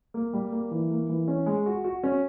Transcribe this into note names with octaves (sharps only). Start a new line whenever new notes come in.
A#3
G3
A#3
E3
A#3
E3
C#4
G#3
F#4
F#4
C#4